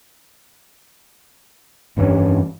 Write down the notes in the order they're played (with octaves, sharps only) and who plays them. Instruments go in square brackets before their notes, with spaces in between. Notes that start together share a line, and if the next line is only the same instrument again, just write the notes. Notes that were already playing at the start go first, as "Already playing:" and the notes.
[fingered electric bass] F1 G2 E3 C#4